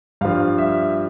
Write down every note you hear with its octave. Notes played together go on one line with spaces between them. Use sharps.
G2 F3 F5
E5